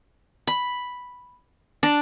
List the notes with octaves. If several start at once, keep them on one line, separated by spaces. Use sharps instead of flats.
B5
D4